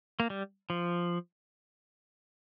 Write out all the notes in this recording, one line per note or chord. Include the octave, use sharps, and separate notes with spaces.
A#3
G3
F3